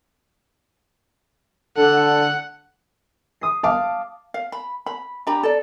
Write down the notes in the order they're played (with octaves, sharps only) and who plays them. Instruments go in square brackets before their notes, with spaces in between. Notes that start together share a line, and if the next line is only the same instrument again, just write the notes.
[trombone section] D3 D4 A4 [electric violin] F#5
[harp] D#6 C7
[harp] F5 [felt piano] A5 D6
[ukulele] F5
B5
B5
D4 G4 A#5 B5
A4 D5